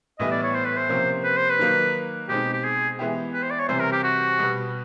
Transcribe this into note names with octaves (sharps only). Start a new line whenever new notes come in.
A2 E3 G3 B3 E4 D#5
D5
C#5
C5
B4
C5
C3 F3 A#3 C#4
B4
C5
B4
D#3 F#3 A#3 D#4
B2 G#3 C4 D#4 G4
G4
G#4
E3 G#3 B3 E4 G4
B4
C5
D5
C#5
C3 E3 G3 C4 C5
A#4
G4
F#4
B2 G3 B3